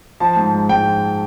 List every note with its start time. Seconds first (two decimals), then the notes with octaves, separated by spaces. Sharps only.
0.20 F3 A5
0.37 G#2
0.53 G#3
0.69 G#2 G5
0.86 F3